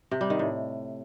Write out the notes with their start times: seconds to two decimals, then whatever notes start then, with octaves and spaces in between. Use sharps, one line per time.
0.11 C3
0.21 G3
0.30 D#3
0.39 A2